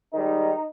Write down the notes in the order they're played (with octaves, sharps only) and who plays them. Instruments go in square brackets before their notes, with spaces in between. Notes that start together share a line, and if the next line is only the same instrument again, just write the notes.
[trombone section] G#2 D#3 G3 D#4